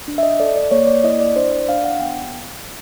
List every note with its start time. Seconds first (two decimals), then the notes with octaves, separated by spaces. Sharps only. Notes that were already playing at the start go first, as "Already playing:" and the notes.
0.08 D4
0.18 E5
0.23 D#5
0.40 A4 D5
0.56 D5
0.71 A#3 C#5
0.87 D5
1.04 E4 D#5
1.20 D5
1.36 D4 C5
1.52 D5
1.69 D4 F5
1.84 F#5
2.01 B3 G5